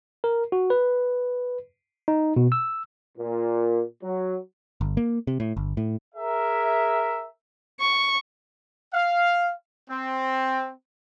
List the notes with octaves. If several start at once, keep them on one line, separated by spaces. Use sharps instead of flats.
A#4
F#4
B4
D#4
B2
E6
A#2
F#3
G1
A#3
C3
A2
G1
A2
G#4 A#4 E5
C#6
F5
C4